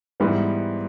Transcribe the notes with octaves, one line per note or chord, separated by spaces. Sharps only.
G#2 E3 G3 B3